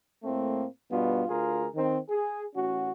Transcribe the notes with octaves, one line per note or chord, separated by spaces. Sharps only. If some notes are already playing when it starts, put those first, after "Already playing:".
A2 A3 A#3 C4
G2 B2 B3 F4
D2 F4 G#4 A#4
D#3 C4
G#4
A1 C#4 F#4